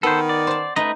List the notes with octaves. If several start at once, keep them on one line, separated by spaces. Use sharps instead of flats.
D#3 B3 A4 C5
D5
C5 A5
A3 D#4 B4 D#5